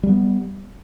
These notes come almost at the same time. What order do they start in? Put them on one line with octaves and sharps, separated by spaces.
G3 A3 B3